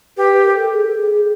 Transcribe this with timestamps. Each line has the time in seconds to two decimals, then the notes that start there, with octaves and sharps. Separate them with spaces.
0.17 G4 B4
0.33 B4
0.44 A#4
0.55 A4
0.73 G#4
0.85 A4
0.95 G#4